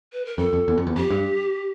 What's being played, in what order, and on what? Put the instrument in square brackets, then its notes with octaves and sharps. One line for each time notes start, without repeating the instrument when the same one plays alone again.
[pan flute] B4
A#4
[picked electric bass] F2 [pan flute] A4
[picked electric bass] F2
E2
F2
E2
[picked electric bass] F2 [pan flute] G4
[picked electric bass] G2